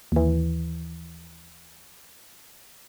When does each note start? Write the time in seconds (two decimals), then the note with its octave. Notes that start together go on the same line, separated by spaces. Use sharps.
0.12 D#2 E3